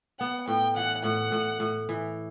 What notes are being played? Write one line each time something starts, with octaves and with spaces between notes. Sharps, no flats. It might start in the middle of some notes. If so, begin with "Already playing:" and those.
B3 F#5
A2 G5
E3 F#5
A2 F#5
A2
A2
E3